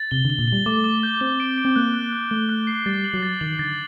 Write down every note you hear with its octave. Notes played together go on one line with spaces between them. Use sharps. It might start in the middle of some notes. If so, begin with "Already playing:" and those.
Already playing: A6
C3 G7
D3
G7
A#2
G3 G7
A3 D6
D6
G6
C4 G7
D7
D7
C4
A#3 F#6
F#6
F#6
A3 G7
F#6
C7
G3 A6
F#7
F#3
A6
D#3 F#7
D3 A6